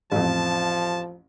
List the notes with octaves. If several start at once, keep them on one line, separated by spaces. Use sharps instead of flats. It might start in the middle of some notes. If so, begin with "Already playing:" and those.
A1 F2 F3 A5